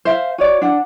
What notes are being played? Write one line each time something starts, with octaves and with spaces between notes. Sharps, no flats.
C5 E5 F5
F#4 C#5 D5
D4 F#5